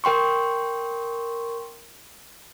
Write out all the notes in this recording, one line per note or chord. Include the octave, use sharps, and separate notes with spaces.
A#4 G5 C6 C#6